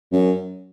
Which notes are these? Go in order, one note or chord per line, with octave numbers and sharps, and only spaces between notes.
F#2